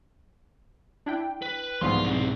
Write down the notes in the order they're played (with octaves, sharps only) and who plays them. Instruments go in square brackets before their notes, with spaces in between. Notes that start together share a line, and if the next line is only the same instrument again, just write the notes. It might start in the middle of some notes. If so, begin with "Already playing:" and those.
[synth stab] D4 E4 G5
[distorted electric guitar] B4
[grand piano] C2 G#2 [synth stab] E3 F3 B3 [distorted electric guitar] F5 C6
[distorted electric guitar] B1 C4